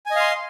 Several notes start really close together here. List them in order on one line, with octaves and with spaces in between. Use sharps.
G#5 D#5 F5 C6